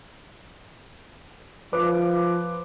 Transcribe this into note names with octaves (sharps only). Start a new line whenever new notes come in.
F3 B4 D6